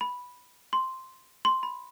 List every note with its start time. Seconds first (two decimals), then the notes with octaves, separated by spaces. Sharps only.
0.01 B5
0.73 C6
1.45 C6
1.63 B5